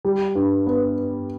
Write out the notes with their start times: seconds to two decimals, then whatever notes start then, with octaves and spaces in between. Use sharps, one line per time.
0.05 G3
0.35 G2
0.67 B3